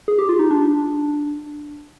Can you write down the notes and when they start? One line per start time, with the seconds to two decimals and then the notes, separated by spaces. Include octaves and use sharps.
0.08 G#4
0.19 G4
0.29 F4
0.39 D#4
0.51 D4